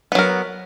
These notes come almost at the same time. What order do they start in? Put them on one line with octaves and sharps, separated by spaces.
B3 F#3 A#4